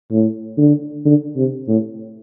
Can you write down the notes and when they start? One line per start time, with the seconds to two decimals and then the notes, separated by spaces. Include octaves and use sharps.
0.11 A2
0.58 D3
1.05 D3
1.36 C3
1.68 A2